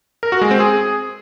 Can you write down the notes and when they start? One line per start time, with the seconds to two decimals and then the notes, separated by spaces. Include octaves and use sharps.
0.23 A#4
0.32 F#4
0.41 G#3
0.51 C4
0.60 G#4